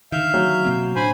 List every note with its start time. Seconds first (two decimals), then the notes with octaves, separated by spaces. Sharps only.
0.12 D3 D#3 E5 F5 G6
0.34 F#3
0.65 B2 A#3 C4
0.96 A2 D4 C5 G#5 B5